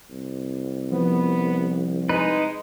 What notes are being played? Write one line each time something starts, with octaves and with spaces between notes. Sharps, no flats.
C2
F3 B3
G#3 D#4 B4